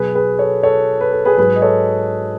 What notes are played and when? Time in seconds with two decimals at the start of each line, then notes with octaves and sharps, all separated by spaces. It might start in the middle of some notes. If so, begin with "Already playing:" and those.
Already playing: B2 F#3 G#4 B4
0.15 G#4 B4
0.39 A4 C#5
0.63 A4 C#5
1.01 B4
1.13 A4
1.25 G#4 B4
1.37 G#2 F#3 G#4 B4
1.56 D#5
1.62 A4 C#5